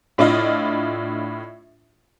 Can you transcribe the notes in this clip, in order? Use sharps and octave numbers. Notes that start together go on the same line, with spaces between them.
A2 D4 E4 F4 D#5